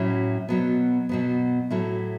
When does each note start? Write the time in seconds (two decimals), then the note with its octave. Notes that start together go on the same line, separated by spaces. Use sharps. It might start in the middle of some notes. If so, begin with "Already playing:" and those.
Already playing: A2 F#3 C#4 E4
0.49 B2 F#3 B3
1.09 B2 F#3 B3
1.70 A2 F#3 A3 E4